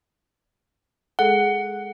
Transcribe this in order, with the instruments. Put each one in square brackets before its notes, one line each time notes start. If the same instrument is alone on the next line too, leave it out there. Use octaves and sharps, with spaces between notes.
[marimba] G#3 G#4 A4 [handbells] F#5